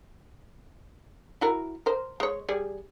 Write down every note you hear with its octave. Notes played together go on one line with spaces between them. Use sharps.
E4 F#4 A#4
A#4 C5
G#3 C#5
G3 G#4 D5